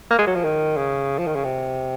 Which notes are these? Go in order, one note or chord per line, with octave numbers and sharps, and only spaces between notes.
A#3
G#3
F#3
F3
D#3
C#3
F3
D#3
C#3
C3